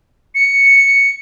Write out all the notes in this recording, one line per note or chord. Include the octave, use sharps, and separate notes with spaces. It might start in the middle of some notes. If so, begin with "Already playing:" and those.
C#7